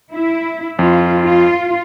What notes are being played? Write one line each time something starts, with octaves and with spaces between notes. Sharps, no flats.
E4
F2 F4
F4